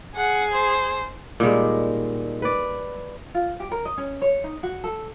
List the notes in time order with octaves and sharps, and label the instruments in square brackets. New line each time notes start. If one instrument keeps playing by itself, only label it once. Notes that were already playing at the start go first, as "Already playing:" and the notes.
[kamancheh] G#4 [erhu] F#5
[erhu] C5
[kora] A#2 D#3 G3 G#3
B4 D5
[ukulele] F4
G4
A#4
D#5
C#4
C#5
D#4
F#4
A4